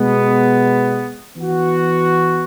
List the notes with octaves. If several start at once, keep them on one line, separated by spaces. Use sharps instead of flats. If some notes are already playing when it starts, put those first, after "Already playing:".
Already playing: B2 G#3 B3
E3 B3 F#4